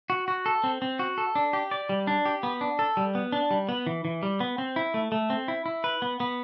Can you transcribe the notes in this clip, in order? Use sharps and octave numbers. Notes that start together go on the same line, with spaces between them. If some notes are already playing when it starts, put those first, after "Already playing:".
F#4
F#4
A4
C4
C4
F#4
A4
D4
G4
D5
G3
D4
G4
B3
D4
A4
G3
B3
D4
G3
B3
E3
E3
G3
B3
C4
E4
A3
A3
C4
E4
E4
B4
B3
B3